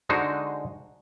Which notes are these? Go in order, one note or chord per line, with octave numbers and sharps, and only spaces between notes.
D3 G#3 D#4 F#4 C5